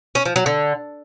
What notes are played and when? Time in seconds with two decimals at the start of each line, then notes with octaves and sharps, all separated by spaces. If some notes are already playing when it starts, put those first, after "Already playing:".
0.15 C#4
0.25 F3
0.36 F#3
0.46 D3